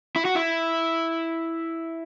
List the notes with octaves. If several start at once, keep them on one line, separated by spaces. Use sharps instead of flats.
E4
F#4
E4